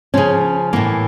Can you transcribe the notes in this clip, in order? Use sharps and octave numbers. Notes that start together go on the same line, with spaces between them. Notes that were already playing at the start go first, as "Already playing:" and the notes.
C#3 F3 C#4
A2 E3 A#3